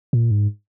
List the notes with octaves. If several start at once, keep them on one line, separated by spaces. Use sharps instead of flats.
A#2
G#2